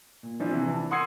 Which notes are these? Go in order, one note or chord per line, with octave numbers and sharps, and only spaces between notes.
A#2
E3 F3 D4
C3 E3
A5
F#5 C6 D#6 E6 G#6 C7